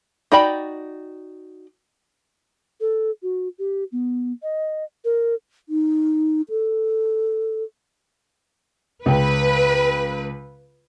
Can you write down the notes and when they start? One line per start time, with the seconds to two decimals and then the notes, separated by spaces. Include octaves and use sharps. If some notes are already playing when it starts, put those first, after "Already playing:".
0.32 D#4 F#4 D5 G5 B5
2.81 A4
3.23 F#4
3.59 G4
3.92 B3
4.43 D#5
5.05 A#4
5.69 D#4
6.50 A4
9.06 C#2 B4 G5